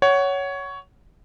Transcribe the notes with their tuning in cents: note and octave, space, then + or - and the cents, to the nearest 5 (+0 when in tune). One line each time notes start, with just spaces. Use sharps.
C#5 +10 F#5 +15